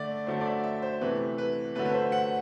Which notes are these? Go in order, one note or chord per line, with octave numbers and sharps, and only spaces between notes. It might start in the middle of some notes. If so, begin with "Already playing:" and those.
Already playing: D3 A3 D5
D3 F#3 A3 C5
D5
E5
E5
C5
C3 E3 A3 B4
B4
D3 F#3 A3 B4
B4
C5
F#5